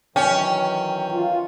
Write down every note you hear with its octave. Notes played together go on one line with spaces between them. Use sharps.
D#3 E3 F#3 C#4 G5
F4